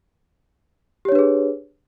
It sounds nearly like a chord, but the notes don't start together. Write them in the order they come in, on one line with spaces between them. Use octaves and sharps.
G4 C#5 D4 B4 G#4